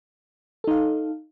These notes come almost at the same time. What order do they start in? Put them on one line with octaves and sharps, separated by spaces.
A4 D#4 F5